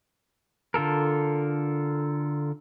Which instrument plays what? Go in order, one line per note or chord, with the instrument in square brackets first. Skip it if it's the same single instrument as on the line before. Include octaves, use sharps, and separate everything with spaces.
[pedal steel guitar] D3 F4 A4 A#4